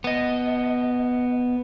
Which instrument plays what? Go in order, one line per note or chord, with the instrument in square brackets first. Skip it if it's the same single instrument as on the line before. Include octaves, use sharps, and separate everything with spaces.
[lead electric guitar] B3 D#5